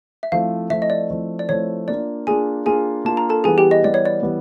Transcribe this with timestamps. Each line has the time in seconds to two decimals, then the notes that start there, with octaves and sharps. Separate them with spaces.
0.23 E5
0.32 F3 A3 C4 E4 F5
0.70 F3 A3 C4 E4 E5
0.82 D#5
0.90 D5
1.09 F3 A3 C4 E4
1.39 D5
1.49 F3 A3 C4 E4 C#5
1.88 A#3 D4 F4 D5
2.27 A#3 D4 F4 G#4 G#5
2.66 A#3 D4 F4 G#4 G#5
3.05 A#3 D4 F4 A5
3.17 A#5
3.29 A4 A5
3.44 E3 G3 B3 G#4 G#5
3.58 G4 G5
3.71 D#5
3.83 E3 G3 B3 D5
3.94 C#5
4.05 D5
4.23 E3 G3 B3